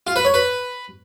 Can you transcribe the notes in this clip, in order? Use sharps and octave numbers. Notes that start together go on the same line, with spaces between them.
F4
B4
C#5
B4